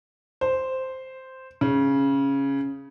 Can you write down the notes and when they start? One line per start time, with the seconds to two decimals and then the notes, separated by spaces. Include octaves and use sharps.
0.41 C5
1.61 C#3